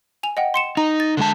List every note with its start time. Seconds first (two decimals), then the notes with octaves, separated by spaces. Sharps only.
0.23 G#5 F7
0.37 D#5 F#5 G5
0.54 C6 C#7 E7
0.77 D#4 A#5
1.00 A6
1.17 D3 G#3 A5